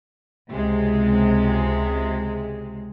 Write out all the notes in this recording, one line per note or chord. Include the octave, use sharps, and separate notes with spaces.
C#2 C3 G#3